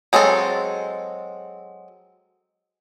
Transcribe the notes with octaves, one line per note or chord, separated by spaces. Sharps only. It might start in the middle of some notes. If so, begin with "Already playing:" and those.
F#3 G#3 C4 D4 A4